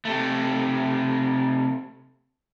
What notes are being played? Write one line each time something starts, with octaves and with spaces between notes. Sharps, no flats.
C3 A3